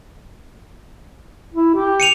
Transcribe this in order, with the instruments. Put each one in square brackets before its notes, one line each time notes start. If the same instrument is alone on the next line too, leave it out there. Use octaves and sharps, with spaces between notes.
[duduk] E4
G4
[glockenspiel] C#7 D#7 F7